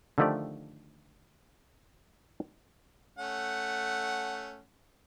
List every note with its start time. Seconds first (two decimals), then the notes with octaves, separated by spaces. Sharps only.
0.18 D3 D#3 F3 A3 G4 D5
3.18 A3 C#4 F#5